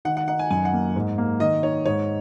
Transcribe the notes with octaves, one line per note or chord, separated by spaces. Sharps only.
D#3 F#5
F#5
D#4 F#5
G#5
F#2 G#5
F#5
A#3
G#2
A#3
D#3 D#5
D#4 C#5
G#2 C#5